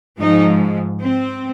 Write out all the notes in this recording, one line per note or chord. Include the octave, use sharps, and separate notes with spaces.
G#2 F3 D#4
C4